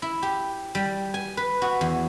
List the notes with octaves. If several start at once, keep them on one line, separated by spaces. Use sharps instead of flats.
E4
G4
G3
G#5
B4
F#4
E2